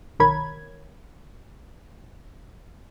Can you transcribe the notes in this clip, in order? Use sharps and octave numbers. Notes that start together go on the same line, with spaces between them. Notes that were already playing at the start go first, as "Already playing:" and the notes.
B1 D#3 A#4 C#5 B5 G#6